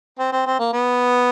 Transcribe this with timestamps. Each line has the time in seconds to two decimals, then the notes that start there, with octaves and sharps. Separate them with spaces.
0.19 C4
0.32 C4
0.46 C4
0.59 A#3
0.73 B3